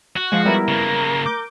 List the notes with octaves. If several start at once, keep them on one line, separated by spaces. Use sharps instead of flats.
F#4
F3 G#3 F5
G3 B3 E4 A#4
C#3 A#3
D6 G6